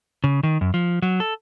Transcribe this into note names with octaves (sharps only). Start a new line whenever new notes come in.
C#3
D#3
F#2
F3
F#3
A4